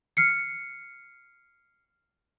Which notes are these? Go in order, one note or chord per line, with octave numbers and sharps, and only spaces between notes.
F6 C7 C#7